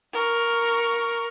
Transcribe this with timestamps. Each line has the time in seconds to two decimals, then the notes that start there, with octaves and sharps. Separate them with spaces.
0.13 A#4 C#6